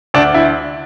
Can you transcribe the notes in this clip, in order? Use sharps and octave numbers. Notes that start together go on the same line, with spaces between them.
D2 D4
E4